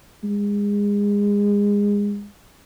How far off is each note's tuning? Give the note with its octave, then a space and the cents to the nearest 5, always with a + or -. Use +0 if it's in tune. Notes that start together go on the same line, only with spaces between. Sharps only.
G#3 -25